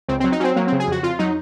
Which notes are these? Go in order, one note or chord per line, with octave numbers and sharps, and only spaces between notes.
C#2 C4
F#3 C4
D#4
F#3 C4 C#4
F#3 A#3
C#3 C4
G#4
F2 F#4
F2 F4
F#3 D#4